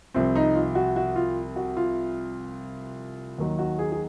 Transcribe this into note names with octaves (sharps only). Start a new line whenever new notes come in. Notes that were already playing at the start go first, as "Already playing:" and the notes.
C2 C3 F3 C4
D#4
F4
F#4
F#4
F4
F#4
F4
D#2 D#3 F#3
F#4
G#4
G#4